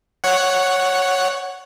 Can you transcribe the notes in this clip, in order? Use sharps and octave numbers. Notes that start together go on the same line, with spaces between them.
C#5 F#5